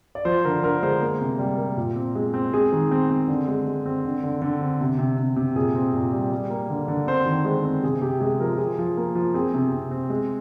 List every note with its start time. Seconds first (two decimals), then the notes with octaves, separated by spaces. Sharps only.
0.15 D5
0.25 F3 C5
0.45 D3 A#4
0.63 D3 A#4
0.82 G#3 C5
1.01 A#3
1.21 C3
1.39 G3
1.58 A#3
1.77 A#2
1.96 C4
2.15 G#3
2.34 C4
2.54 G#3 G#4
2.72 D#3
2.91 C4
3.10 C4
3.28 D3
3.48 G#3
3.67 G#3
3.86 C4
4.05 D3
4.23 D3
4.42 D3
4.61 C4
4.81 C3
4.99 C3
5.18 C3
5.36 C3
5.56 A#2 G#4
5.75 C4
5.93 A#2
6.13 G3
6.32 G3
6.50 A#3
6.70 D3
6.88 D3
7.07 C4 C5
7.26 D#3
7.45 G#3 C5
7.65 C4
7.83 C3 G#4
8.02 C3 G4
8.20 G#3 G#4
8.40 F3 A#4
8.58 F3 G#4
8.78 F3
8.97 A#3
9.15 F3
9.34 C4 G#4
9.54 C3
9.72 C3
9.91 C4
10.10 G#3